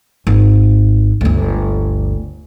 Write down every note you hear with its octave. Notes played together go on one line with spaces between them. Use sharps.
G#1
G1 D2